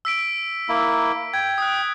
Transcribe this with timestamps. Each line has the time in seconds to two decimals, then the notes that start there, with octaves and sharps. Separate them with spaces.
0.05 E6 B6 D7
0.69 A#3 E4
1.34 G5 G#6
1.58 D#6 F#6